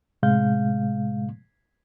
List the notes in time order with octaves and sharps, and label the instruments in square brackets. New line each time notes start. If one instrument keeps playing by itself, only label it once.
[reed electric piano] A2 C3 G#3 F5 G6